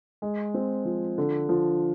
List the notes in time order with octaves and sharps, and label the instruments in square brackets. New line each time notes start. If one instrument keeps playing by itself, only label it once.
[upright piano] G#3
C4
F3
D3
F3